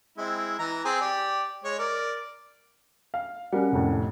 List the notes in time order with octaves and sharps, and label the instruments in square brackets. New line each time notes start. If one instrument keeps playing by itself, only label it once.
[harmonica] G#3 C4 E4
E3 A#5
C4 G#4
G4 D5
G#3 C#5
A#4 D5
[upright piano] F5
[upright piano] G3 [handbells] C#4 A#4 F#5
[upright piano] F1 F2 A2